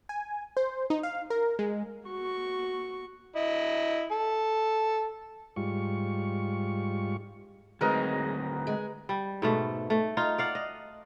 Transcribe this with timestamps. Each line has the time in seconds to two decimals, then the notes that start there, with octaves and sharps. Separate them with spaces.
0.09 G#5
0.57 C5
0.90 D#4
1.03 F5
1.30 A#4
1.59 G#3
2.08 F#4 C#6
3.36 E4 D#5
4.11 A4
5.56 G#2 G3 F4 C#6
7.81 D2 F#3 G#3 C4 D#4 A#4 B4 D#5
8.67 G#3
9.09 G3
9.42 G#2 B2 A3
9.90 A3
10.17 D#4 F4
10.38 D5 F5 F#5
10.55 D#5